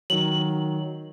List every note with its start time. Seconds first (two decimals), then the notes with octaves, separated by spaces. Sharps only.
0.10 D#3 F#3 F#7